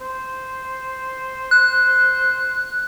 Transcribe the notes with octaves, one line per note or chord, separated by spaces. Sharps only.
C5
F#6